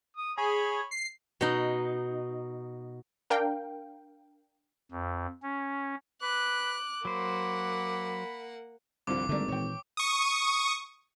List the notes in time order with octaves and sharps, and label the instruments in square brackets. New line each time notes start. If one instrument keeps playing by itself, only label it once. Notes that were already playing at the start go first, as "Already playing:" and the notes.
[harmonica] D#6
[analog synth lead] G#4 [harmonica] C#5 B5
[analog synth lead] C7
[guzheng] B2 D#4
[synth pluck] D4 A#4 F5 G5
[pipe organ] F2
C#4
[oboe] B4 [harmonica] D6 [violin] F#6
[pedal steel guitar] F#3 C5 [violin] A#3 F#5 [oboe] B5
[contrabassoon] C2 [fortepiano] G2 D3 F3 [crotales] D6
[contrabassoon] G#1 [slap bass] D3 E3 G3 [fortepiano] A3 A#3 D4
[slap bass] A#2 E3 [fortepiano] C#5 G5
[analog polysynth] C#6 D#6